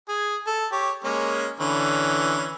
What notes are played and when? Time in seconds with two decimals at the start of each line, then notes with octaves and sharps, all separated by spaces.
0.08 G#4
0.47 A4
0.72 G4 C#5
1.04 G#3 A#3 C#4
1.60 D3 E3 C#4